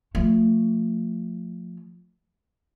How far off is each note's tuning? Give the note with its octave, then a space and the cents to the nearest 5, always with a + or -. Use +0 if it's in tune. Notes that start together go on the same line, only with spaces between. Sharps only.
F3 +20 A3 +30